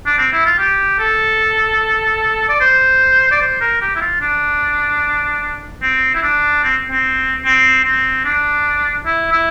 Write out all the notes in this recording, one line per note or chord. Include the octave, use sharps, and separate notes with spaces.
D4
C4
E4
F4
G4
A4
D5
C5
D5
C5
A#4
G4
E4
F4
D4
C4
E4
D4
C4
C4
C4
C4
D4
E4
E4